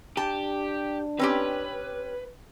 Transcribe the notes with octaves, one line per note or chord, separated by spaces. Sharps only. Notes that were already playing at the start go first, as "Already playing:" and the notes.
D4 G4 A5
C4 C#4 G4 B4